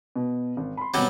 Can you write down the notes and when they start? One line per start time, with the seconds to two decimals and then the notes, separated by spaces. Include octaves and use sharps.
0.16 B2
0.57 G#1
0.77 B5 C6
0.94 G#1 B2 F#3 G3 C#4